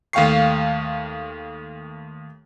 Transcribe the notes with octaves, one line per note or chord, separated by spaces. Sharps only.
D#2 A3 F5 G5 C#6 C7